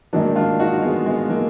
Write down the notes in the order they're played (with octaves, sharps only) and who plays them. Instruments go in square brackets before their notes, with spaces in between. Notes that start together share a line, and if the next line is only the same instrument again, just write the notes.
[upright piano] G#2 D#3 F#3 A#3 D4
D4 F4
D#4 F#4
G#3 B3
G#3 B3
F#3 A#3